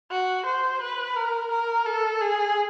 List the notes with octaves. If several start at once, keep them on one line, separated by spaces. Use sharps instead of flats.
F#4
C5
B4
A#4
A#4
A4
G#4